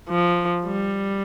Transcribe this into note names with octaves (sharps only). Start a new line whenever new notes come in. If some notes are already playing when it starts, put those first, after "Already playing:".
F3
G3